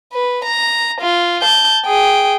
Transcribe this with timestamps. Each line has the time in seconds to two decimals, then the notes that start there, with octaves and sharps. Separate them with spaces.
0.13 B4
0.45 A#5
1.01 F4
1.42 A5 G6
1.85 G#4 G5